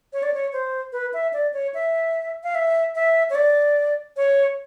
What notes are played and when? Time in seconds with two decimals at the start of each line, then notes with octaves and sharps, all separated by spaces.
0.13 C#5
0.23 D5
0.34 C#5
0.53 C5
0.92 B4
1.13 E5
1.33 D5
1.53 C#5
1.74 E5
2.44 F5
2.55 E5
2.95 E5
3.30 C#5
3.35 D5
4.17 C#5